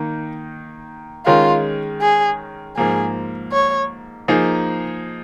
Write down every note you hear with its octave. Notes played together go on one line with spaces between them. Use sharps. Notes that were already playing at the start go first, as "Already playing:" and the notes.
Already playing: D#3 A#3 D#4
D#3 G#3 C#4 F4 A#4
G#4
G#2 F3 A#3 G#4
C#5
F3 A#3 D#4 G#4